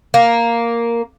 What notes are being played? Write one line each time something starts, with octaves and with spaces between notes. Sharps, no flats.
A#3